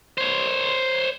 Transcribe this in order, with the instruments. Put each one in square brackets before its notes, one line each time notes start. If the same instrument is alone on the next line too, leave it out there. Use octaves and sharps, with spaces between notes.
[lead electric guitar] C5 C#5